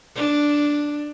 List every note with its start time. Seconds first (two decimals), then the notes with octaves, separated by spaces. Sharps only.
0.15 D4